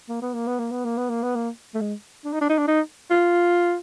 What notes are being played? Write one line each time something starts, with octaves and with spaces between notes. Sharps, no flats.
A#3
B3
A#3
B3
A#3
B3
A#3
B3
A#3
B3
A#3
A3
G#3
D4
D#4
D4
D#4
D4
D#4
F4